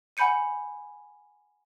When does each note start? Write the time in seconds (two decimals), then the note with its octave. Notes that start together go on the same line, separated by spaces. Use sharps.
0.17 F#5 G#5 B5 G6 C#7 D#7